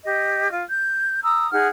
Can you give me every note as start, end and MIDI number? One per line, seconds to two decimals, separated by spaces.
0.03 0.50 67
0.03 0.50 75
0.50 0.62 65
0.68 1.20 91
1.23 1.49 82
1.23 1.49 87
1.23 1.49 88
1.51 1.67 63
1.51 1.67 68
1.51 1.67 78
1.51 1.67 89